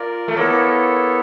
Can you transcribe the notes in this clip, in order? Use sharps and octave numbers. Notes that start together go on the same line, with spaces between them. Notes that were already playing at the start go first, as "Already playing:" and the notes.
Already playing: A#3 F4 A#4 D5
A3
A#3 B3 E4 A4 C#5